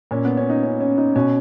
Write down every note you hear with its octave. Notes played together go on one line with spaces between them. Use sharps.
A#2 C#4
B3
C#4
D#4
C#4
C#4
D#4
B2 C#4